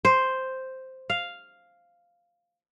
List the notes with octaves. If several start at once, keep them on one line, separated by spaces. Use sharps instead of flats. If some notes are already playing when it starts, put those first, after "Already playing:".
C5
F5